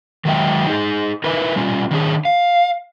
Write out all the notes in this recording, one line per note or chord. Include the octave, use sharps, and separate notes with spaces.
D#3 F#3 G#3 G#4 E5 G5
D#4 G#4
D#4 E4 A#4 B4 E5
G3 C#4 F4
D#3 D4 G#4
F5